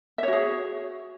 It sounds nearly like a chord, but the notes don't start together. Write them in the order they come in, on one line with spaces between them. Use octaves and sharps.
E5 C#5 F#4 G#4